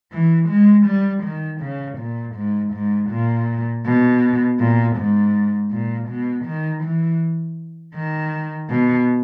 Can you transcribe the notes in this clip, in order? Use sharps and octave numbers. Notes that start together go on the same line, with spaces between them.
E3
G#3
G3
D#3
C#3
A#2
G#2
G#2
A#2
B2
A#2
G#2
A#2
B2
D#3
E3
D#3
B2